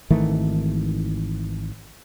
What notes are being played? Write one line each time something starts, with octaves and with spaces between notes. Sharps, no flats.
G#1 D#3 E3 A3